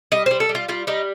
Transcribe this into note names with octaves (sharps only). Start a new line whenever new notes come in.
G3 D#5
G3 C5
A4
G3
F4
G3 F4
G3 D#4